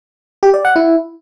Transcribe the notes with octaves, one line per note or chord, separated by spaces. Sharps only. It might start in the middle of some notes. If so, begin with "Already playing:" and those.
G4
D5
F#5
E4